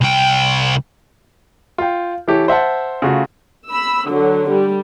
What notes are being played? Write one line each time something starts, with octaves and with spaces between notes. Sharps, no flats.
C2 G5
F4 G5
E3 E4 G4 A4 C#5
C5 E5 F#5 A5
C#3 A3 F4 F#4
B5 E6
D3 F#3
G3